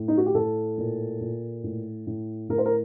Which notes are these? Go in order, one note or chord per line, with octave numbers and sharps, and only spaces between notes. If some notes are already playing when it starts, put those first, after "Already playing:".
Already playing: A2
D#4
F#4
G4
A2 A4
A#2
A#2
A2
A2
A2 A#4
C5
A#4